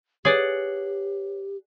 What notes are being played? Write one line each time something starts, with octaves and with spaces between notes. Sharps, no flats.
G4 G#4 B4 C#5 D5 F#5 F#7